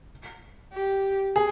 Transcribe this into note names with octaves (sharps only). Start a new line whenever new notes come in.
G4
G#4